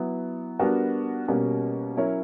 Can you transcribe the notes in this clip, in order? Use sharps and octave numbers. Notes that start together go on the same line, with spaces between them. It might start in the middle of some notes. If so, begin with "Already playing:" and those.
Already playing: F#3 B3 E4
G3 B3 D4 F#4 A#4
B2 G3 A#3 C#4 F#4
F#3 C#4 E4 A#4 C#5